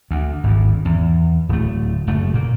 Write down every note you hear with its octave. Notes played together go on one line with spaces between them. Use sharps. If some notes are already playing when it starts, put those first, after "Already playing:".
D2
G#1 D2
E2
D1 A3
F#1 A3
A#2 A#3